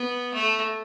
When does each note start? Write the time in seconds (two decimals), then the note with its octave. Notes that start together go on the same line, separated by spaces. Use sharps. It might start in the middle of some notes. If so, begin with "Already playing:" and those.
Already playing: B3
0.34 A3